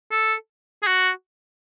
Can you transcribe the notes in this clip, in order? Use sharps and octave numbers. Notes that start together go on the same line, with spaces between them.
A4
G#4
F#4